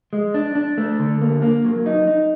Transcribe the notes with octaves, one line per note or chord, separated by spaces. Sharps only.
G#3
D4
D4
A3
D3
A#3
A#3
F#3
D#4
D#4